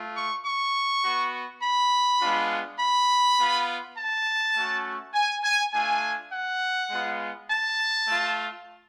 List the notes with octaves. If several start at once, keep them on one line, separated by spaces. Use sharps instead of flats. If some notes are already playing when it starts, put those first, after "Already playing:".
Already playing: A3 F4
C#6
C#6
B3 F#4
B5
G#3 B3 D4 F4
B5
B3 F4
A5
A3 C#4 F#4
G#5
G#5
A3 D4 F4 G#5
F#5
G#3 B3 F4
A5
A3 F4